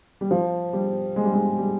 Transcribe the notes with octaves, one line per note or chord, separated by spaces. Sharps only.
G3
F3
G3
G#3
G3
G#3
G3